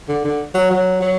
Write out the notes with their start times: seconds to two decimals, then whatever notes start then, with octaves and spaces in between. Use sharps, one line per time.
0.09 D3
0.24 D3
0.54 F#3
0.71 F#3
1.01 F#3